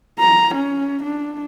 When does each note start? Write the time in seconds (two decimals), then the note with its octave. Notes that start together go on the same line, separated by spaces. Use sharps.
0.19 A#5
0.55 C#4
1.03 D4